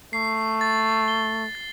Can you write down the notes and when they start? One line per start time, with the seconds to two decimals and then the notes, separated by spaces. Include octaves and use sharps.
0.13 A3 C7
0.61 A6
1.08 G7
1.55 A6